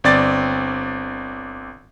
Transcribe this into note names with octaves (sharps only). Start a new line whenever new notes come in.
G1 C4 D5 A6